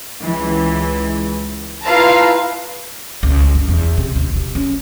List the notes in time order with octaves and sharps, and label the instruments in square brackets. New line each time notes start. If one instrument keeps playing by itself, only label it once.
[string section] C#2 E3
E4 F4 B4 F5 A5 A#5
[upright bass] C#2
G1
E2
C3
D2
C3
C#4